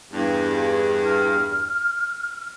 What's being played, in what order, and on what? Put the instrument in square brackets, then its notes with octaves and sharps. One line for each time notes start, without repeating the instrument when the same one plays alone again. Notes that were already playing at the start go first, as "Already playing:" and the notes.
[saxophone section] E2 G2
[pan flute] F6